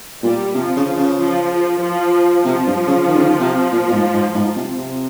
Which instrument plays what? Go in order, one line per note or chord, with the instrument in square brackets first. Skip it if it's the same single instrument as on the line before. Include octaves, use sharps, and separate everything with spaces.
[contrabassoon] A#2 [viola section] G3
[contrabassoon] C3 [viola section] F3
[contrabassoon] C#3
C#3
[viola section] F3
F3
[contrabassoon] C3 [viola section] F3
[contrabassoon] G2
C#3
D#3
C#3
D#3
C3
A#2
A#2
G#2
G#2
[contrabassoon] G#2 [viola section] F3
[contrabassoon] C3
C3